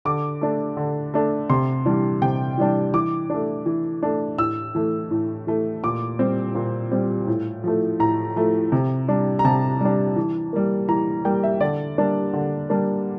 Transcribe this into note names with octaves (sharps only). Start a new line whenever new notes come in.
D3 D6
A3 D4
D3
A3 D4
C3 C6
E3 G3 D4
C3 G5
E3 G3 D4
E3 D6
A3 D4
E3
A3 D4
A2 E6
E3 A3
A2
E3 A3
A#2 D6
G3 C4
A#2
G3 C4
A2
F3 A3
A2 A#5
F3 A3
C3
G3 D4
A#5
C3 A5
G3 D4
E3
G3 A#3
E3 A#5
G3 A#3 G5
E5
D3 D5
G3 A#3 D4
D3
G3 A#3 D4